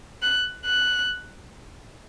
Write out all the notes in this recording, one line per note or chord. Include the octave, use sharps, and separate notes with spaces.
F#6
F#6